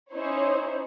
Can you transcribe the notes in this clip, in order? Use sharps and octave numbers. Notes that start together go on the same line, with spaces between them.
C#4 D#4 E4 C5 C#5